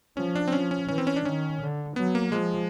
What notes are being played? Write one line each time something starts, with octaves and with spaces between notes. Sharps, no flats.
F3 C#4
D4
C4
F3 C#4
C#4
E3 C#4
C4
C#4
D4
D#3 C#4
D3
F#3 B3
A#3
F3 G#3